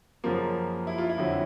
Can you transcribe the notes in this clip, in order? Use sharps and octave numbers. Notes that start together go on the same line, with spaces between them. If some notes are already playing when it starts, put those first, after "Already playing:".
F#2 C#3 F3 A#3 F4
E4
F4
E4
F2 D3 F#3